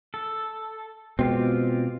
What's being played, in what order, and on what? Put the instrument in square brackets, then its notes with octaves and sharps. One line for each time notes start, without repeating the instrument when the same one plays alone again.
[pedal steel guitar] A4
[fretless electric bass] B2 G#3 [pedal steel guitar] C4 F4 G4